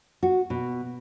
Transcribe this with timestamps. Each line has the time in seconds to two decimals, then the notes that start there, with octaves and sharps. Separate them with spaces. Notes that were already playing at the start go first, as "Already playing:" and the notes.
0.23 F#4
0.50 B2